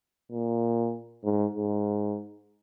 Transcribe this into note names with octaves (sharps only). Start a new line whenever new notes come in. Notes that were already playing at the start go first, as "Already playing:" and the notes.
A#2
G#2
G#2